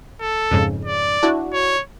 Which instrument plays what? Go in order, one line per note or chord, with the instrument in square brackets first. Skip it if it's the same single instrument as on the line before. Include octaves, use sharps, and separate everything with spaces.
[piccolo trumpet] A4
[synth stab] F2 G#2 C#3
[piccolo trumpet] D5
[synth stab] D4 E4 F#4
[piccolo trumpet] C#5